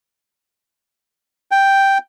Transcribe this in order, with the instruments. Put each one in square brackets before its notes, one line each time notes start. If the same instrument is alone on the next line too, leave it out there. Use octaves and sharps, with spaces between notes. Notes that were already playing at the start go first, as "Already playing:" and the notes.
[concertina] G5